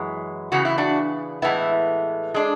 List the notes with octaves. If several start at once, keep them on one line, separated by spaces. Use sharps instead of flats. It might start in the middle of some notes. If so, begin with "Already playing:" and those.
Already playing: F#2 E3 G#3
C#3 E3 B3 F#4
E4
D4 F#4
A2 E3 G#3 B3 E4
G#3 D4